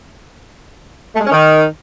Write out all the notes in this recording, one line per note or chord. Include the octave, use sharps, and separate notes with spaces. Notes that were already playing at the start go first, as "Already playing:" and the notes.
A3
G#3
C#4
D#3